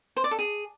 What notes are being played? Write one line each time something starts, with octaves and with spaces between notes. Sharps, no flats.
C5
D5
A4
G#4